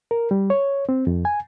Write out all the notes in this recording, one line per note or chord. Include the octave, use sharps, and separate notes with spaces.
A#4
G3
C#5
C4
F2
G#5